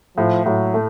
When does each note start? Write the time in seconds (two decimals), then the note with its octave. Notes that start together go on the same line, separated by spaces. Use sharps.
0.18 A2 F3
0.45 A2 F#3
0.74 A3